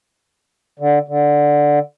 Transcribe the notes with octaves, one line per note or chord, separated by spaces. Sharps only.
D3
D3